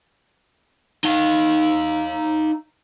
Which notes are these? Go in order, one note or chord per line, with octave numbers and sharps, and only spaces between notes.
D#4 F5